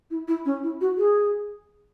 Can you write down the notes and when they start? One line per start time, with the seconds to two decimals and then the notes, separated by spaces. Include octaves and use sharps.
0.11 E4
0.28 E4
0.45 C#4
0.63 E4
0.81 F#4
0.98 G#4